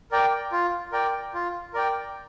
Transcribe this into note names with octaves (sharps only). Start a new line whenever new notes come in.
A#4 D5 G5
F4
A#4 D5 G5
F4
A#4 D5 G5